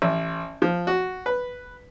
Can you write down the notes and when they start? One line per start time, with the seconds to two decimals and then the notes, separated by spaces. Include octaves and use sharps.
0.02 A1
0.62 F3
0.87 F#4
1.26 B4